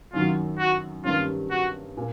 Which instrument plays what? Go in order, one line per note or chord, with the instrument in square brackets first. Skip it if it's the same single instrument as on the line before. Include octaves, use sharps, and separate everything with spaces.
[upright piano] F#2 D#3 F#3 [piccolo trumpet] F4
[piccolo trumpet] F#4
[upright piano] G2 D#3 G3 A#3 C#4 [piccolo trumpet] F4
[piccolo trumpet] F#4
[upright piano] A#2